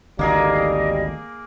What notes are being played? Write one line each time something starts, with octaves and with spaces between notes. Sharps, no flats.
G#1 D2 D3 G3 A#3 G#4 A#4 D#5